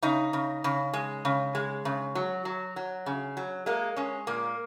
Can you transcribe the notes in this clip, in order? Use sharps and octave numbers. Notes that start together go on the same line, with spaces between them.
C#3 D#4
C#3
C#3
G#3
C#3
G#3
C#3
F#3
F#3
F#3
C#3
F#3
G#3 A#3
G#3 C#4
A#2 A#3